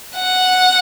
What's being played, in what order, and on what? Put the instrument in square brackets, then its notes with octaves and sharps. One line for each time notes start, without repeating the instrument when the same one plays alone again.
[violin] F#5